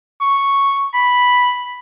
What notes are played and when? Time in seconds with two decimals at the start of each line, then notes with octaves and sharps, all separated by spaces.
0.21 C#6
0.93 B5